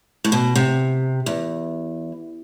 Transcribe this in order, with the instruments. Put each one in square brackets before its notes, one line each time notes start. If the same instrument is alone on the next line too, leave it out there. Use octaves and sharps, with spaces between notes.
[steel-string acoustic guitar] A2
B2
C3
E2